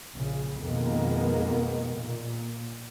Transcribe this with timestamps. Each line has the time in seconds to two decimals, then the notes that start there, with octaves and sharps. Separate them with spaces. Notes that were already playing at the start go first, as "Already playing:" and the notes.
0.14 A#1 C#3
0.60 F2 B2 D#3 G#3 A#3 B3
1.96 A#2